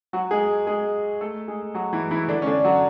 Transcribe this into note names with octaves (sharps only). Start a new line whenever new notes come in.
F#3 F#4
G#3 G#4
G#3 G#4
A3 A4
G#3 G#4
F#3 F#4
E3 E4
E3 E4
D3 D4
C#4
D3 D4
F#3 F#4